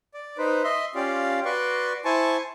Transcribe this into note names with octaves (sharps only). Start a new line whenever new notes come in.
D5
D#4 B4 C5
D#5 E5 C6
C#4 F4 G4 D5 F5
F#4 B4 D5 C6 C#6
E4 C5 G#5 A5 C#6